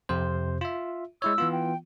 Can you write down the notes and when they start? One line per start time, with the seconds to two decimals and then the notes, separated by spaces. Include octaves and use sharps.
0.09 F2 C3 C5
0.61 F4 E5
1.22 G#3 E4 C#5 E6
1.38 E3 B3 F4
1.52 G5